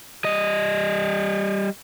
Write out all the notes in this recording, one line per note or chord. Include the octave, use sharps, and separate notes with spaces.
G3 D#5